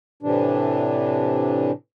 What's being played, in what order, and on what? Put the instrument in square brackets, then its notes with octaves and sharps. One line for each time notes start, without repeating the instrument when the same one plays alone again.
[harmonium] A2 C3 E3 D4